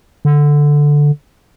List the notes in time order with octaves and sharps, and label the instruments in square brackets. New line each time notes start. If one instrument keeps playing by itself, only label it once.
[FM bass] D3